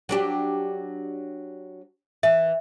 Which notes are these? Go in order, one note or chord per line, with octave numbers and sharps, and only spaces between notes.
F#3 D4 G4
E3 E5